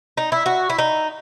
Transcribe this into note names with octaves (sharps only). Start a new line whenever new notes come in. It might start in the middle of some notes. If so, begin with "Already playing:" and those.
D#4
E4
F#4
E4
D#4